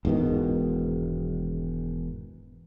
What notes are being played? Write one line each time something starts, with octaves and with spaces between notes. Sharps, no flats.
E1 G#2 B2 D#3